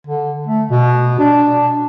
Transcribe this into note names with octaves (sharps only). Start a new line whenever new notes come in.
D3
A3
B2
D4